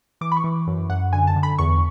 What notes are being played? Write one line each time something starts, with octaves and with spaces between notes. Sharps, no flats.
E3 D6
B5
C#6
E3
F#2
F#2 F#5
D3 G#5
A5
D3
B5
E2 C#6